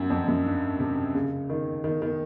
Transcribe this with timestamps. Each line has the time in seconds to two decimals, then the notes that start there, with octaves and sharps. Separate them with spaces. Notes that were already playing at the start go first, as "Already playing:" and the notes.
Already playing: F#2
0.10 F2
0.28 F#2
0.45 G2
0.80 C3
1.15 C#3
1.50 D#3
1.84 D#3
2.02 D#3